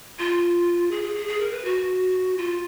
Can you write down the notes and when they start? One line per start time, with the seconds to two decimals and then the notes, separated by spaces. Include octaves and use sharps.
0.19 F4
0.91 G#4
1.04 G#4
1.15 G#4
1.28 G#4
1.40 A#4
1.52 B4
1.65 F#4
2.38 F4